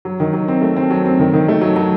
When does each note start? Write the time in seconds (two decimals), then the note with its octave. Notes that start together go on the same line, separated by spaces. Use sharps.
0.05 F#3
0.20 D#3
0.33 F#3
0.48 C4
0.62 A3
0.76 C4
0.91 F#3
1.06 C4
1.19 D#3
1.34 D#3
1.48 A3
1.62 F#3
1.76 F#3